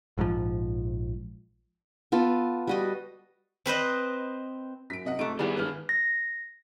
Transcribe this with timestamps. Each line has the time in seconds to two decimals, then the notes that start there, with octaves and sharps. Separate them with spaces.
0.18 A#1 G#2 C3 F3
2.12 B3 F4 A4
2.67 G3 F#4 D#5
3.66 C4 B4 C5 D#5
4.90 F#2 B6 D7
5.05 C3 D#5 F#5
5.19 F1 G#2 A3 D7
5.39 E2 D#3 G3 B3 G#4
5.57 E1 B4 F6
5.89 A#6